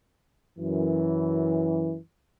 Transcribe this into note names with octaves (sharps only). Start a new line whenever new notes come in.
F#2 E3